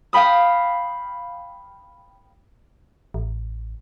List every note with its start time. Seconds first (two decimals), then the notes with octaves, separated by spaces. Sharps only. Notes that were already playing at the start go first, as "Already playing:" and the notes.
0.13 F5 G5 B5 D#6
3.14 A1